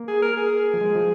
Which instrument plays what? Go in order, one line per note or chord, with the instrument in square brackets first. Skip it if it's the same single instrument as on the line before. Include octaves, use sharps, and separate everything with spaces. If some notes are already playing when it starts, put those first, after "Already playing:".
Already playing: [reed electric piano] A#3
[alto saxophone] G#4
A#4
G#4
[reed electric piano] F3
G#3
F3